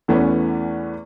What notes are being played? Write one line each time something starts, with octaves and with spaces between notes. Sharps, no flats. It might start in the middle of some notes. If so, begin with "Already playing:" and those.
E2 E3 A3 B3 C#4